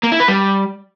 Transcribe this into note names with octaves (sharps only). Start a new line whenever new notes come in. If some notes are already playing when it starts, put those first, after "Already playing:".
A#3
E4
B4
G3